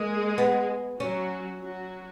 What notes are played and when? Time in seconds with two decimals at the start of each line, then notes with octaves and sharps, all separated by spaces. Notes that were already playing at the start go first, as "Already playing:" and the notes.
Already playing: G#3 A#3 G#4
0.38 B3
1.00 F#3 C#4 F#4
1.62 F#3 F#4